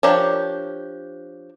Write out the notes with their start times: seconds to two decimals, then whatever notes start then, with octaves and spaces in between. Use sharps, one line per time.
0.03 F3 D4 G4 A#4 C#5